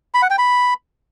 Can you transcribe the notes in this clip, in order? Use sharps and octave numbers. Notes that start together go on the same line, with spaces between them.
B5
F#5
G5
B5